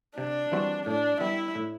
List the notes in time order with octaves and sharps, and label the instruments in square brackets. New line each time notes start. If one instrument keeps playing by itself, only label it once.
[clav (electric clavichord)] C3 [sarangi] D4
[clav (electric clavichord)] E3 G3 C4 F#4
[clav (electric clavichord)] A2 [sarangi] D4
[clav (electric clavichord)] G3 B3 [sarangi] E4
[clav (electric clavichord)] A2